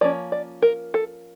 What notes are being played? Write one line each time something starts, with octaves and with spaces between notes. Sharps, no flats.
F3 A#3 C#4 D5
D5
A#4
A4